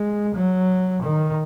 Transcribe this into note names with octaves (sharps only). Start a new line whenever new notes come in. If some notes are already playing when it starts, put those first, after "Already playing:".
Already playing: G#3
F#3
D#3